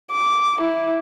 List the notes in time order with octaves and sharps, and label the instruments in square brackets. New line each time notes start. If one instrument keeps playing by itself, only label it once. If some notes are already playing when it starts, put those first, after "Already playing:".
[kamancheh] D6
E4